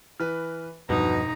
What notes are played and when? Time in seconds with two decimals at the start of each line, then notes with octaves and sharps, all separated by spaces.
0.20 E3 B4 F6
0.89 E1 E2 G2 B2 F3 D#4 A#5